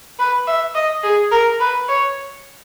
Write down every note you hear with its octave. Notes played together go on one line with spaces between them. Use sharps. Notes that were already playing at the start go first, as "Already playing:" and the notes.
B4
E5
D#5
G#4
A#4
B4
C#5